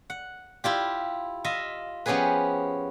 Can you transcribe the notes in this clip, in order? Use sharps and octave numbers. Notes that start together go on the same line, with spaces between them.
F#5
E4 F4 G4
F4 D#5 E5
F3 B3 C#4 G4 G#4 B4